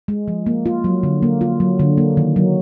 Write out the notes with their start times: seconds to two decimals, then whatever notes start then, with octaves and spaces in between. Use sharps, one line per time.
0.08 G#3
0.28 F3
0.46 A#3
0.66 F4
0.84 F#3
1.03 D3
1.23 A#3
1.41 F4
1.60 F#3
1.79 D3
1.98 A#3
2.17 D#3
2.36 F#3